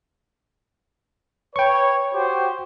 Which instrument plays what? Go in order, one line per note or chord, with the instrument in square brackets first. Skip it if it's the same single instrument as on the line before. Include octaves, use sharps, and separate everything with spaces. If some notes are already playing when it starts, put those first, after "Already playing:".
[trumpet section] B4 C#5 [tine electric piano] G5 C#6
[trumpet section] F#4 G4 C5